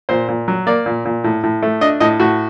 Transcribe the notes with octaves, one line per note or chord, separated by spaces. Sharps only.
A#2 C5
A#2
F#3
A#3 D5
A#2
A#2
A2
A2
A3
D4 D#5
A2 D#5
A2 F#4